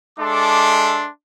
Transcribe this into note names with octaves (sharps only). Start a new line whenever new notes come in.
G#3 D4 A4 E5 C6 D6